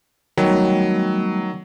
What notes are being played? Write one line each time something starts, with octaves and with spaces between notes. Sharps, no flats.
D#3 F#3 G3 A3 B3